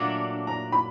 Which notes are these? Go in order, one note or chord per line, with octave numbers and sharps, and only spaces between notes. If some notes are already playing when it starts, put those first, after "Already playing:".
Already playing: A#2 F#3 A3 D4
A#5
B5